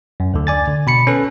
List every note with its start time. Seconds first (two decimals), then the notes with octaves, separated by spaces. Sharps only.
0.20 F#2
0.34 D2 D3
0.47 D5 G#5 A6
0.68 D3
0.87 B2 B5 C#7
1.07 C#4 A4 B4